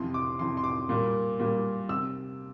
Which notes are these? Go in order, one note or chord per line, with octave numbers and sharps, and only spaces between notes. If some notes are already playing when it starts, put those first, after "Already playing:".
Already playing: F2 C3 E3 C6
D6
F2 C3 E3 C6
C6
D6
A#2 G3 A#3
A#2 G3 A#3
C3 E6